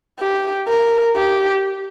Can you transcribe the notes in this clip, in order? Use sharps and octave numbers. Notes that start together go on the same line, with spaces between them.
G4
A#4
G4